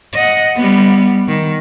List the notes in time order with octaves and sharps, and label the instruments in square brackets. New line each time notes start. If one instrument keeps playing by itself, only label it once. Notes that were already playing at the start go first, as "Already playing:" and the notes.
[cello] D#5 F#5
G3 B3
D#3